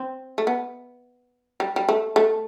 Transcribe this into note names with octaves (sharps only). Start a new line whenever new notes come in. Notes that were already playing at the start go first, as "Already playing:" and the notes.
Already playing: C4
A3
B3
G3
G3
A3
A3